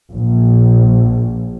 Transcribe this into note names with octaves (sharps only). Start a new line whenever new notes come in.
A#1